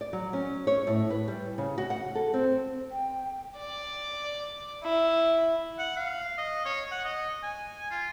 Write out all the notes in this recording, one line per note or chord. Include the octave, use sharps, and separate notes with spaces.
D5
F#3
C#4
C#5
A2
B4
G3
C#3
F#4
F#5
A4
C4
G5
D5
E4
F#5
F5
D#5
C#5
F#5
D#5
G#5
F4